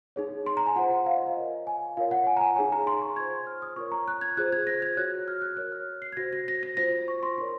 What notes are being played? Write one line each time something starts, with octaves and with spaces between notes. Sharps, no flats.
D#4 G#4 C#5
C6
A#5
G#5
F4 C5 F#5
F#5
F5
D#5
F5
F4 A#4 C#5
G#5
F4 A#4 C#5 F5
F#5
G#5
A#5
G#5
D#4 G#4 C#5 G#5
A#5
C6
C#6
F4 C5 G#6
F6
D#6
F4 A#4 C#5 C#6
A#5
F#6
G#6
F4 G#4 C5 F#6
G#6
A#6
G#6
F#4 C#5 F#6
F6
F#6
F#4 A#4 C#5 F#6
F6
C7
G#6
F#4 C5 A#6
A#6
A#6
A#6
F4 C5 A#6
C#6
C6
D#4 A#4 C#5 C6